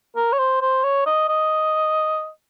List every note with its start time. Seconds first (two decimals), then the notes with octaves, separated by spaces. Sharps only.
0.16 A#4
0.33 C#5
0.39 C5
0.61 C5
0.84 C#5
1.06 D#5
1.29 D#5